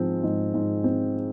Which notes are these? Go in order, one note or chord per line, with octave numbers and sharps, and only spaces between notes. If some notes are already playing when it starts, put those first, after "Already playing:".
Already playing: G#2 F3 C4
G#2
G#2
C4